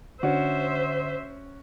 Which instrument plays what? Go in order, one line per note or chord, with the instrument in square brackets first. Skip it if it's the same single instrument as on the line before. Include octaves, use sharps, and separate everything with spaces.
[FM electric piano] D3 [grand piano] C#4 F#4 [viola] C5 E5